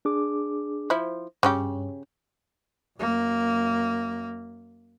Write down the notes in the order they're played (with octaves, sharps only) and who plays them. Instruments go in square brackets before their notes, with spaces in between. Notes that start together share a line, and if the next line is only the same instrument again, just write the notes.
[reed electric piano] D4 G#4 D6
[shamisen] F3 E4
[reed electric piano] G2 [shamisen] C#3 C#4 G4
[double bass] F#2 A#3